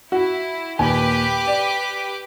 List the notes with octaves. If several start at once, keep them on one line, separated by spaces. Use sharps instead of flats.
E4 F#4
D#2 A#2 G4 B4 G#5 D6
D5